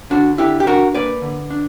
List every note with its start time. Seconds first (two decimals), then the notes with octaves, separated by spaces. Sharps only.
0.10 D3 D4 F#4
0.38 D3 E4 G4
0.60 G4
0.67 D4 F#4 A#4
0.94 A#3 B4 D5
1.22 D3
1.50 D4